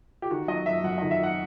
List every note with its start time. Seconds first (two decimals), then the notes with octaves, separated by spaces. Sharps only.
0.22 G4
0.31 D#3 F#4
0.48 F#3 D#5
0.66 F#2 E5
0.84 F#2 F#5
0.98 D#3 D#5
1.11 E5
1.20 F#3 F#5